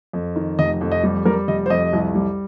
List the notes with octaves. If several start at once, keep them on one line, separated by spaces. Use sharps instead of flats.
F2
D#3
F1 D#5
F2
D#5
G3
G3 A#4
F1 D#5
C5
F2 D#5
C2
G3